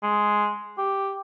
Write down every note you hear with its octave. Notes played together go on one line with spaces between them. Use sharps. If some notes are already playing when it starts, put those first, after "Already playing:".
G#3
G4